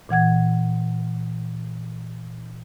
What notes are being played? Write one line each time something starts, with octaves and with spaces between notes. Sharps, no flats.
A#2 E3 F#5 G#6